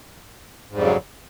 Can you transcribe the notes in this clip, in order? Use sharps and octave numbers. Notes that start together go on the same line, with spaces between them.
F2 G#2 C#3 F#3 G3